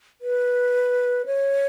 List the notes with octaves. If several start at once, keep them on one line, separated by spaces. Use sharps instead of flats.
B4
C#5